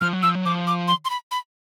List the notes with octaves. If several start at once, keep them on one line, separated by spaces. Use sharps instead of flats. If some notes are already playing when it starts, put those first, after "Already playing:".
F3 F6
F#3
F3 E6
F#3
F3 D6
D6
C6
C6
B5
B5